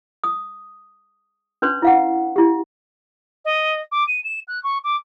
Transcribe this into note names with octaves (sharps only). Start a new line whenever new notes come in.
D#6
C#4 D4 B4 C6
E4 F5 F#5
E4 G4
D#5
D6
D#7
E7
F#6
C#6
D6